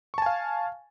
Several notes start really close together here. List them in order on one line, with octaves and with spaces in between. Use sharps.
C#6 A5 G#5 F5